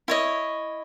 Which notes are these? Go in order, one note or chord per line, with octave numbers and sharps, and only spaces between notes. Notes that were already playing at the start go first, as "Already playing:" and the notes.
E4 C#5 D#5